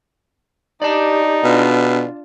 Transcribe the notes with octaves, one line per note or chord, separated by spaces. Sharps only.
D#4 G4 D5 A5
B2 D4 F4